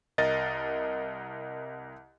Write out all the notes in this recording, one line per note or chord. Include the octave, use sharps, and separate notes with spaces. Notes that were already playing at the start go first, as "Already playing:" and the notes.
C2 A#4 D#5 A6